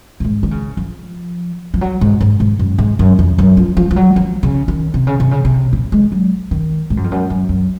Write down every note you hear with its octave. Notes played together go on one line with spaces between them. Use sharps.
F#2
G#2
D#3
C#3
F3
F3
F#3
G#2
G#2
G#2
F#2
G#2
F#2
F2
F#2
F3
F3
F3
F#3
F3
C#3
D#3
C3
C#3
C3
C#3
C3
A#2
G#3
F#3
D#3
G#2
F#2
F2
F#2
F#2
F#2